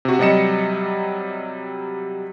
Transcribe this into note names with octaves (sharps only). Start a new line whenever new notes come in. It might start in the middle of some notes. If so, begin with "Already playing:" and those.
C3 F#4
C3 F#3 G3 D#5 C#7 E7